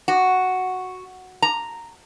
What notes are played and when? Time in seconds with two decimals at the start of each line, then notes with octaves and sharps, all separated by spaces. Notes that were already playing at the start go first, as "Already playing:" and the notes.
0.08 F#4
1.42 A#5